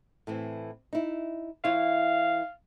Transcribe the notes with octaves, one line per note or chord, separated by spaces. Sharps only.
A2 E3 C4
D#4 E4
E3 E4 C#5 F5